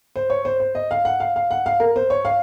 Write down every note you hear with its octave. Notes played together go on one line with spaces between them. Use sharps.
C5
C#5
C5
C5
D#5
F5
F#5
F5
F5
F#5
F5
A#4
C5
C#5
F5